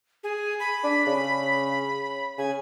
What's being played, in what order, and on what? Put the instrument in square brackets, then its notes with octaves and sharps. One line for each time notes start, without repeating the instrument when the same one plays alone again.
[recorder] G#4
B5
[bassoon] D4
C#3
[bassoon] C#3 [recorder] G#5